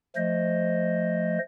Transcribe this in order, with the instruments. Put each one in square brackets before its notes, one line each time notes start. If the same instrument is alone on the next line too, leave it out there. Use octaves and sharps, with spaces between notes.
[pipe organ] F3 A3 C5 D#5